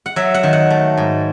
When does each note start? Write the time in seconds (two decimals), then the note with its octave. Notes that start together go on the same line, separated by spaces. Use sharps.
0.06 F#5
0.16 F#3 E5
0.34 F#5
0.43 D#3
0.53 F#5
0.70 A3
0.97 G#2